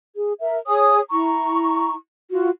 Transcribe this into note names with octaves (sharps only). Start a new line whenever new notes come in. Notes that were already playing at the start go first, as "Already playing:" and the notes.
G#4
A#4 E5
G#4 C#5 G#5 D#6
E4 A#5 C#6
F4 F#4